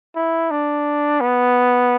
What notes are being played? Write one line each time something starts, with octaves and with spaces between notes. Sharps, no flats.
E4
D4
B3